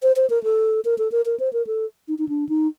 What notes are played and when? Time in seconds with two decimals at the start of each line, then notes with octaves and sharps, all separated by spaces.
0.03 C5
0.16 C5
0.30 A#4
0.44 A4
0.85 A#4
0.98 A4
1.12 A#4
1.26 A#4
1.40 C5
1.53 A#4
1.67 A4
2.08 D#4
2.18 D#4
2.29 D4
2.49 D#4